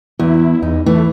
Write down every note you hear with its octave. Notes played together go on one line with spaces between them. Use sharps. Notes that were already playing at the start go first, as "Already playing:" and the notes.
E2 E4
E2 D#4
E3 A3